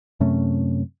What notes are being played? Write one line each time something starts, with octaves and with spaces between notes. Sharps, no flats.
F#2 C3 A3 C#4